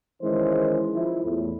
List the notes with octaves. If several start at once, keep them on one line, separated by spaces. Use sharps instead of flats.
D#3 E3 G#3 C#4 E4 C5
F3 E4
E2 A2